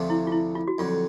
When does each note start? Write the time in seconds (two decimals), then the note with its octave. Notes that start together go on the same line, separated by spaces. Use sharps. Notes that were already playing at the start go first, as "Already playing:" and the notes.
Already playing: D2 C3 F3 A3 D4
0.10 E4
0.27 F4
0.32 E4
0.55 F4
0.68 F#4
0.78 F2 D3 F#3 F4